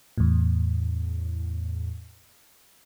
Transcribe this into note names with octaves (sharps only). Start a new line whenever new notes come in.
E2 A2